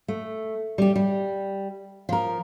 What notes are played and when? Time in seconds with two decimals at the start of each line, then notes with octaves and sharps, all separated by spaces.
0.08 A3
0.78 G3 G4
0.96 G3
2.09 F3 A#4